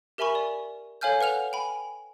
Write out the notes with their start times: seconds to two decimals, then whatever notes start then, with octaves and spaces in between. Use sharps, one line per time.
0.18 G4 A#4 E5 G#5 B5 C#6
0.35 D5
1.01 A4 C#5 F5 G#5 F6 G6
1.21 B4 F#5 F6 F7
1.53 G5 G#5 B5